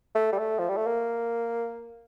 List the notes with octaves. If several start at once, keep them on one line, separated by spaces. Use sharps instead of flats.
A3
G3
A3
F3
G3
A3
A#3